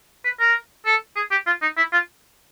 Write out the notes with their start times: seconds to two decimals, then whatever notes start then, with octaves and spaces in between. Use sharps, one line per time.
0.24 B4
0.40 A#4
0.86 A4
1.16 G#4
1.31 G4
1.46 F4
1.62 D#4
1.77 E4
1.93 F4